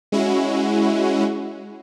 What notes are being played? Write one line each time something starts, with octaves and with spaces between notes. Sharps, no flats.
G#3 C#4 E4 F#4